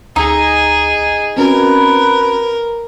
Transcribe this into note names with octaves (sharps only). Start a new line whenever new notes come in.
D2 D#4 G#4
C4 C#4 F#4 A#4 B4